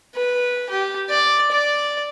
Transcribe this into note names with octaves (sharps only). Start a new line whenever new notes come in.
B4
G4
D5
D5